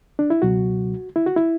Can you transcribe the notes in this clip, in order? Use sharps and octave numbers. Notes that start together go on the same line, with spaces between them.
D4
E4
C#2 B2 F#3 F#4
E4
F#4
E4